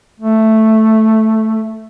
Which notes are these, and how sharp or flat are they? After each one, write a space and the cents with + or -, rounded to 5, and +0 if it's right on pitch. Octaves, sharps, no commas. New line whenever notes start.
A3 +0